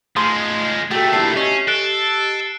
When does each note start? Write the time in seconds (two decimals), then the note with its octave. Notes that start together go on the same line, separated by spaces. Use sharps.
0.16 F3 G#3 A3 C6 D#6
0.91 A#2 A3 F#4 G4 A4
1.13 D4 E4 G4 C7
1.37 C#4 D#5
1.68 A4 F#6 D7